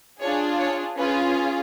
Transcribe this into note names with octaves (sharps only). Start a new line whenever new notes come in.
D4 F4 G#4 C#5
C#5
C#4 F4 G#4 B4